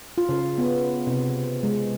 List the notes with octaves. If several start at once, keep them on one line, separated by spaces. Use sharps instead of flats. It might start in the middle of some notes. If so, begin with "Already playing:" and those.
F4
C#3
B3
C3
G#3